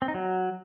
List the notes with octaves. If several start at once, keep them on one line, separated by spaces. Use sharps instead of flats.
C4
D#4
F#3